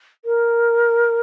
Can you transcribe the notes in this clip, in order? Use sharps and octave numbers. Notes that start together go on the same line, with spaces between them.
A#4